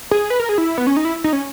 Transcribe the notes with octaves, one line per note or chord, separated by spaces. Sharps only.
G#4
B4
A#4
G#4
E4
B3
C#4
D#4
E4
D#4
C#4